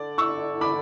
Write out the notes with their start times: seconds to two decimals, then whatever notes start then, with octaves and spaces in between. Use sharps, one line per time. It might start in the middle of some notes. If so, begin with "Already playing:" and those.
Already playing: D3 D5
0.18 C#6 E6
0.61 B5 D6